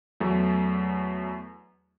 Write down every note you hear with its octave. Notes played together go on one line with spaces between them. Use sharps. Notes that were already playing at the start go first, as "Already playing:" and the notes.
E2 F#3 A3